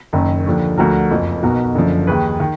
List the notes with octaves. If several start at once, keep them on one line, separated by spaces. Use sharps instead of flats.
F#1 F#2 D#3
D#2 D3 F3
D2 D3 F3 F#4 A#4
F#1 F2 F3
B1 B2 F#4 A#4
F#1 F#2 D3 F3
D#2 D#3 G#4 B4
D#3